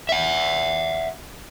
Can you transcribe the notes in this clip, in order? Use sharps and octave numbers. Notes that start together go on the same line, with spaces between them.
E5 F#5